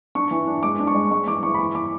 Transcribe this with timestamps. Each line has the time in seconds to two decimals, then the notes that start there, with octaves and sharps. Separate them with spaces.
0.15 D4 C#6
0.31 E3
0.47 D4
0.63 G#3 D6
0.80 D4
0.87 C#6
0.95 G#3
1.11 G#3 C#6
1.27 E3 D6
1.43 E3 C#6
1.54 B5
1.58 E3 C#6
1.75 E3 D6